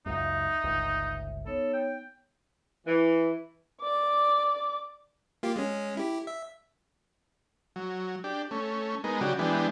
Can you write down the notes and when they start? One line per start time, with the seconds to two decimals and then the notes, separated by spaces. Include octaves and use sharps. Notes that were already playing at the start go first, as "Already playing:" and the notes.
0.06 C#2 F#2 D#4 E5
0.64 G1 C#2
1.46 B3 D#4 A4 C#5
1.73 G5
2.86 E3
3.81 D5 D6
5.43 A#3 F4 G4
5.56 G#3 C#4
5.97 E4 G4
6.27 E5
7.76 F#3
8.24 D4 G4
8.51 A3 C#4
9.04 G#3 B3 D#4 A#4
9.21 C#3 F#3 F#4 G4 D5
9.39 E3 G#3 B3 D4 G4